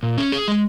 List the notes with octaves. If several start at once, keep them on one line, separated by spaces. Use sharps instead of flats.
A#2
C#4
G#4
G#3